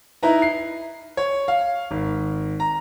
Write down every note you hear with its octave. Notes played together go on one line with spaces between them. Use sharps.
D#4 E4 B4 A#5
C7
C#5
F5
G#1
A#5